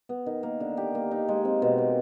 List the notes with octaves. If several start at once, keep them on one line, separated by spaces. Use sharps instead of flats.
B3
D#3
A#3
D3
G4
A#3
D#4
G#3
C4
B2
A#3